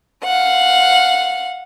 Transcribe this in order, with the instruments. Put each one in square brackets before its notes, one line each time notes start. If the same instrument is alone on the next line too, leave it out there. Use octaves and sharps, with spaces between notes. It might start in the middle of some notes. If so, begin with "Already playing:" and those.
[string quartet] F5 F#5